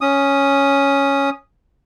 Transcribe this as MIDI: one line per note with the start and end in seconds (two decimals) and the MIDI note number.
0.01 1.30 61
0.01 1.30 87